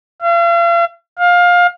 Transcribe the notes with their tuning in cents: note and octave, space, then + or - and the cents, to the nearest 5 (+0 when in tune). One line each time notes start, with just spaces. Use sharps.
F5 -40
F5 +20